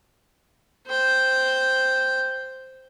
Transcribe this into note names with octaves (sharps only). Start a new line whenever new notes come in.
C5 G5